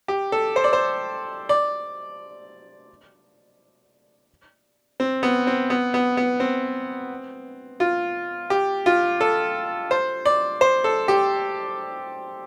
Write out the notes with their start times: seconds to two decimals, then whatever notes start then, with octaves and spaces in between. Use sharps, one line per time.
0.08 G4
0.32 A4
0.56 C5
0.64 D5
0.73 C5
1.49 D5
5.00 C4
5.23 B3
5.47 C4
5.70 B3
5.94 B3
6.17 B3
6.40 C4
7.80 F4
8.50 G4
8.86 F4
9.21 A4
9.91 C5
10.26 D5
10.61 C5
10.84 A4
11.08 G4